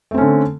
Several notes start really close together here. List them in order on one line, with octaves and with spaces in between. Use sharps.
A3 C4 C#4 D3